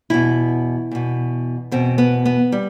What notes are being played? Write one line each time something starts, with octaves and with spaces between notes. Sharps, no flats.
E2 B2 E4
E2 B2
E2 B2 C4
B3
B3
G3